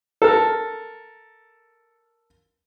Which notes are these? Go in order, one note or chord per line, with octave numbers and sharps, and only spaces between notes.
A4 A#4